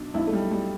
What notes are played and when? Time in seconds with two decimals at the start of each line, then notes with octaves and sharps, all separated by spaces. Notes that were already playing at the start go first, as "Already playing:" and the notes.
Already playing: B1 B2 D4
0.14 B1 B2 E4
0.27 A3
0.33 G3
0.51 G3